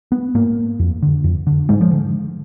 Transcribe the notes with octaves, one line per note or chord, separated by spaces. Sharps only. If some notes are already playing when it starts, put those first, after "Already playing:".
B3
G#2 A#3
F2
D3
F2
D3
G#2 G#3
F3
D3